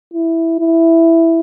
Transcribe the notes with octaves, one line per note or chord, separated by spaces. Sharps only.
E4
E4